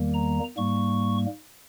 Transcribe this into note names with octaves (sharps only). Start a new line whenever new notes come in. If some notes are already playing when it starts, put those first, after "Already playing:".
Already playing: E2 D#3 G3 A#3
A#5
G#2 G3 A#3 C#6